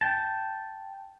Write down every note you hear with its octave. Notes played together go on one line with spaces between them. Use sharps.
G5 A5